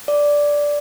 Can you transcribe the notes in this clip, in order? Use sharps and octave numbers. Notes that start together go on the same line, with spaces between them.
D5